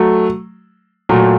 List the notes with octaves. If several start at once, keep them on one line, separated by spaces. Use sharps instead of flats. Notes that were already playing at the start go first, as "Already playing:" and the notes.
Already playing: F#3 A3
A#2 F#3 A3